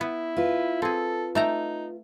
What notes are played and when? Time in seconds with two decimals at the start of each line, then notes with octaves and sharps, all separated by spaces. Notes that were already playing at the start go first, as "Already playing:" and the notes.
0.01 B3 E4
0.37 F4 B4
0.82 C4 G#4 A4
1.35 A3 D#4 G5 A#5